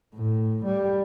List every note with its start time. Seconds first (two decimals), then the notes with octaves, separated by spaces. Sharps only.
0.14 A2
0.65 G3